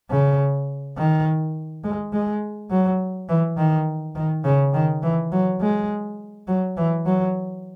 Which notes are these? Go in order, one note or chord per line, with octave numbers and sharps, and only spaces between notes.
C#3
D#3
G#3
G#3
F#3
E3
D#3
D#3
C#3
D#3
E3
F#3
G#3
F#3
E3
F#3